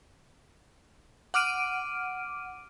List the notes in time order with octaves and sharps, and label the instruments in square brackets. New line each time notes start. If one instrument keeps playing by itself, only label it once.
[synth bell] F#5 D6 F6 D7 D#7